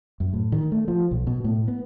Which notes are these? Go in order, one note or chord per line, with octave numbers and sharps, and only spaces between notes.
F#2
A2
D#3
A3
F3
B1
B2
A2
B3